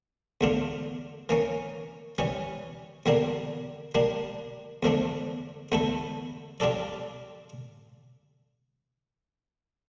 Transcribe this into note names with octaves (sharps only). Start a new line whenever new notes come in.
E2 D3 A3 D4 F4
E3 A#3 C#4
E3 G3 C#4
E2 D3 G3 A#3 D4
G3 A#3 D4
E2 D3 F3 A3 D4
E2 D3 A3 E4 A4
G3 D4 F4 A4 D5